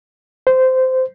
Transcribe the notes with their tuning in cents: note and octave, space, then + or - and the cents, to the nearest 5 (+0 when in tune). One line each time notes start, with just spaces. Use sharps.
C5 -15